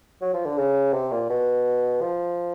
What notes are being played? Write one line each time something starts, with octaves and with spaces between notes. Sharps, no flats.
F#3
F3
D3
C#3
C3
A#2
B2
F3